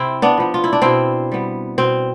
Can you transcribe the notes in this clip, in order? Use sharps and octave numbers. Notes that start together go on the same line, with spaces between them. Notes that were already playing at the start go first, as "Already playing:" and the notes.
Already playing: C3 C4 E4
B3 D4
F3 B3
F4
E4
D4
B2 C4 E4
G3 B3
B2 C4